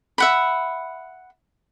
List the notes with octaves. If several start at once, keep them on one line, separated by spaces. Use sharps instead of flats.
E5 F#5 B5